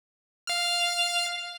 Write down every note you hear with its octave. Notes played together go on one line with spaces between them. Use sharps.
F5 F6